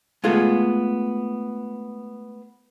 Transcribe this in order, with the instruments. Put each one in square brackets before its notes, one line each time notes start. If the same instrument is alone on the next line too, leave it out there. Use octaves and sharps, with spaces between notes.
[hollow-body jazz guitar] G#3 A3 B3 F4 G#4 A4